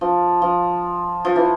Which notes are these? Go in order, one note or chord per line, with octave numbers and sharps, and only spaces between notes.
F3
F3
F3
E3